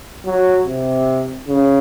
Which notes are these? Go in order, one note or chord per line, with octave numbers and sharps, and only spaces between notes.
F#3
C3
C#3